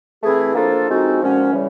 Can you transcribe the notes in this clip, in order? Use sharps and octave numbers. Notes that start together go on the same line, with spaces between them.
E3 A3 C4 E4 G#4
F3 A#3 D4 F4 A4
F3 G#3 C4 D#4 F#4
A#2 F3 G#3 C#4 F#4
C#3 E3 G3